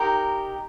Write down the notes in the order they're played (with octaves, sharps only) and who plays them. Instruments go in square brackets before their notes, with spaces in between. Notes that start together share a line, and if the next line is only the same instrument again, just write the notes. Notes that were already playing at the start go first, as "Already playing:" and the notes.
Already playing: [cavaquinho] D#4 G4 A#4